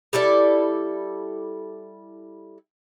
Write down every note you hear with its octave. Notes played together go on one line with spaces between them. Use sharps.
G3 E4 A4 D5